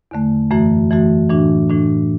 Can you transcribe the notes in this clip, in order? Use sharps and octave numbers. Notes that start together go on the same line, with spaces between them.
E2 D3 A3
F#2 E3 A3 F#4
F#2 E3 A3 F#4
A2 E3 D4 F#4
A2 E3 D4 F#4